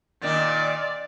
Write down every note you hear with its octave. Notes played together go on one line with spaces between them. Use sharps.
A#2 D#3 D#4 D5